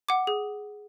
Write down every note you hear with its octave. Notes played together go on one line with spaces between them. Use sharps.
F#5 D6
G#4